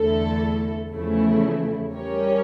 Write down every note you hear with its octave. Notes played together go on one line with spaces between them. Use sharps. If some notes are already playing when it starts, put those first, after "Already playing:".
Already playing: E2 D3 A3 E4 A4
E2 C#3 F3 A3 E4
G3 C#4 G4 A#4 C#5